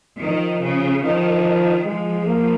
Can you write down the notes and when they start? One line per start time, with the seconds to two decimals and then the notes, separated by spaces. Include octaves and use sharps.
0.22 D#3 F3
0.63 C#3
1.04 D#3 F3
1.86 F3 G#3
2.27 A#3